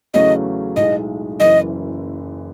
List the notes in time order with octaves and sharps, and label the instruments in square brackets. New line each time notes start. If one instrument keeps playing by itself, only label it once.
[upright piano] E2 C#3 F#3 A3 C#4 [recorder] D#5
[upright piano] B1 A2 G#3 [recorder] D#5
[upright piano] F#1 F#2 E3 [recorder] D#5